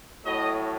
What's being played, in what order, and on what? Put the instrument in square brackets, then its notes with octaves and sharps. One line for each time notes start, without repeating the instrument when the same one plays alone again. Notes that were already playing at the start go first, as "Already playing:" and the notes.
[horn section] A2 F#3 D#5